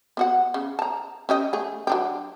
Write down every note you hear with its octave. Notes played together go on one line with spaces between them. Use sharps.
B3 F#4 F#5
C#3
A5 A#5
C#4 G4 D#5
A3 G#4
F#3 D4 G4